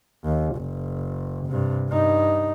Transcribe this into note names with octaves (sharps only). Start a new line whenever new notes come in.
D#2
F#1
G2 C3
G2 D#4